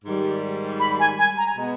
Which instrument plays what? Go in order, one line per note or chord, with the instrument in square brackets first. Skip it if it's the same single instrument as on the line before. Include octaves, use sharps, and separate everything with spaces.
[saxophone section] G#2 D#3 G3
[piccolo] B5
G#5
G#5
A#5
[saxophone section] B2 G#3 B3